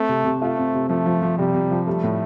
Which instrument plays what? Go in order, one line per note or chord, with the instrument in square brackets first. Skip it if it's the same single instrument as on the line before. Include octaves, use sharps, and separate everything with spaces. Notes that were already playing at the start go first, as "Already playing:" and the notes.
Already playing: [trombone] A3 [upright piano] C4
[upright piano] C3
C3
[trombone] A3 [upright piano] F4
[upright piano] C4
C3
[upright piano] F3 [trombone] A3
[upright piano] F3
F3
[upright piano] C3 [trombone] G3
[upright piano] C3
F3
[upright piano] G3 [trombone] A3
[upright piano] A2